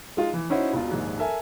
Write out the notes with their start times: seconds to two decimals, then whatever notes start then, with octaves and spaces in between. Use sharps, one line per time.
0.17 G#3 D#4 F4
0.33 E3
0.50 C#4 D#4 E4 F#4 C5 C#5
0.73 E1 B2 F4
0.91 A#1 D#2 G#2
1.18 A4 A#4 E5 G#5